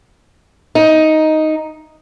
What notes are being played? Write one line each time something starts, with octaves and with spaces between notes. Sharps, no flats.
D#4